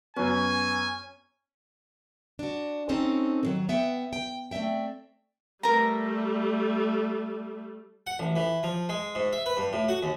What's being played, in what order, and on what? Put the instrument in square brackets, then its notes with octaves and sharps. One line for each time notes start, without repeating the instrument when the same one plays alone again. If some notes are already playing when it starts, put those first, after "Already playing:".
[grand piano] F#2 B3 [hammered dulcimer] C#4 [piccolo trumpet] G#5
[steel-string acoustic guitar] D4 F#4
C4 C#4 D#4 A4 C5
D#3 E3 F#3
B3 E5 F#5 G5
G5
A3 C4 D5 E5 G5
[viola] G3 A3 [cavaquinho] A#4 A#5
[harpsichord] F#5
A1
E3
F3
G#3
G#2
E5
B4
G2
A2
F#4
D#2